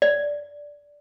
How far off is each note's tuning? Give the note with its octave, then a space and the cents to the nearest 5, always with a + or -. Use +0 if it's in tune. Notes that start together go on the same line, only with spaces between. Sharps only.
D5 -10